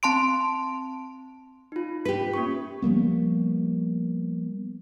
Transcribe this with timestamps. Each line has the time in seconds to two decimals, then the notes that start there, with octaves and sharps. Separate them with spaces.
0.03 C4 A5 C6 D7
1.72 D#4 F4
2.05 G4 B4 B6
2.34 A#3 C#4 C#6
2.82 F3 G3 A#3 B3